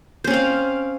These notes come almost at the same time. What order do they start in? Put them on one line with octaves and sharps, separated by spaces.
C5 C#4 C4 F5